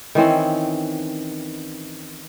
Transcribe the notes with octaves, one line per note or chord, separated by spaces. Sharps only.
D#3 E3 C4 C#4